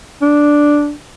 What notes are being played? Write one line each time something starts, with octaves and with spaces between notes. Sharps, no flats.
D4